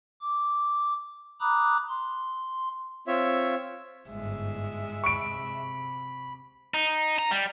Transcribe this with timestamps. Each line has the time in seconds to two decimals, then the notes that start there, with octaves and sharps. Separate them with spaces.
0.21 D6
1.41 A#5 B5 D6 D#6 F#6
1.89 C6
3.07 C4 F4 C#5 E5
4.09 G1 G#2 G#3 E5
5.04 C3 B5 C#6 D7
6.74 D#4
7.19 A#5
7.31 G3